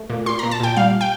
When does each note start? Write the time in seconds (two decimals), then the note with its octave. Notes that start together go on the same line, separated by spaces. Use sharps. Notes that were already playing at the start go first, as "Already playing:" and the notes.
Already playing: A3
0.10 A#2
0.26 A#2 C6
0.39 A#2 A#5
0.51 A5
0.60 A#2 G5
0.76 G3 F5
1.01 G5